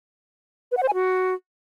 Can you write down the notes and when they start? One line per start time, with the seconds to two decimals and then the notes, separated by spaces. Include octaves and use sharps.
0.72 B4
0.77 F#5
0.83 C5
0.88 G#5
0.94 F#4